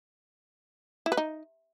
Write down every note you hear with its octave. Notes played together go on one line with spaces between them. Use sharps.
E4
B4
D#4